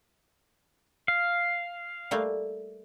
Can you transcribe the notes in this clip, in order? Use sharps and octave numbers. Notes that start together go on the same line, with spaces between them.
F5
G3 A3 A#3